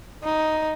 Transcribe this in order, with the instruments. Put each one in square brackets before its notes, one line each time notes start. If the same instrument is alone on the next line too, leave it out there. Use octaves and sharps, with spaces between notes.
[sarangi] D#4